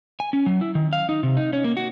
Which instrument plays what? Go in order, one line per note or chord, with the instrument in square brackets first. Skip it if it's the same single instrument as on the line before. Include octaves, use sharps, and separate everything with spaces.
[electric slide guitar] G#5
C#4
F#3
E4
D#3
F5
D#4
C3
D#4
C#4
A#3
F#4